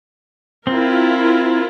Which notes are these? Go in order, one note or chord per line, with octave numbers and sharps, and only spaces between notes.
C4 E4 F4 A#4